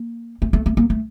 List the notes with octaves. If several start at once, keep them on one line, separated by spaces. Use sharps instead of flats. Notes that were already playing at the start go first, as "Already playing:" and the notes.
Already playing: A#3
A3
A3
A3
A#3
A3